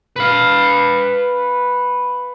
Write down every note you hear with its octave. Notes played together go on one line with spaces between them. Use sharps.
B4 F5